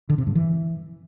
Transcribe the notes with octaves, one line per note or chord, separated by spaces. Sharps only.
D3
C3
G2
E3